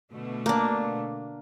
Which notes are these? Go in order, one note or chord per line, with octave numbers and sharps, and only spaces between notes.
B2 D3 A3
A#3 D4